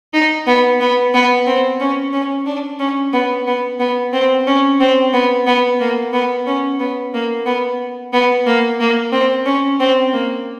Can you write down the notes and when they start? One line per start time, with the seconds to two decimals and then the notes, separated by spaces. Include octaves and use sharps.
0.14 D#4
0.47 B3
0.81 B3
1.14 B3
1.47 C4
1.80 C#4
2.13 C#4
2.47 D4
2.80 C#4
3.13 B3
3.47 B3
3.80 B3
4.13 C4
4.47 C#4
4.80 C4
5.14 B3
5.47 B3
5.80 A#3
6.13 B3
6.47 C#4
6.80 B3
7.14 A#3
7.46 B3
8.13 B3
8.46 A#3
8.80 A#3
9.12 C4
9.46 C#4
9.80 C4
10.13 A#3